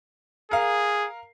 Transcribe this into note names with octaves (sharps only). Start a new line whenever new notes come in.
G#4 A#4 F5